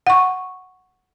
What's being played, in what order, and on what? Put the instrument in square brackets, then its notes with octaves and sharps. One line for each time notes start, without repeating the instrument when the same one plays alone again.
[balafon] F#5 C#6